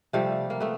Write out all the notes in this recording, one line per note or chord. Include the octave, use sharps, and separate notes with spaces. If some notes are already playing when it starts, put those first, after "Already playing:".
C3 F3 G3 A3
A#3
A3 B3